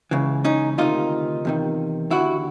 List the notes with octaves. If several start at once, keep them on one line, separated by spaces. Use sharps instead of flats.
C#2 C#3 E3
C#4 D#4
D2 C3 D#3 D#4 F4
E2 C3 D#3
D#2 D3 E4 F#4